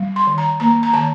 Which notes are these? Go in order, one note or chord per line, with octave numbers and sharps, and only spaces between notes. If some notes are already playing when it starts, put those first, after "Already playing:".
Already playing: G3
C6
D#3
A#5
A#3 A#5
A#5
D#3 A5